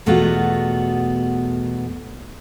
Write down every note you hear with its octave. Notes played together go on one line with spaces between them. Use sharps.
E2 B2 A3 B3 F4 F#4